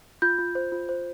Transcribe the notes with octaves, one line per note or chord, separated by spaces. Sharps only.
F4 G6
F4
C5
F4
C5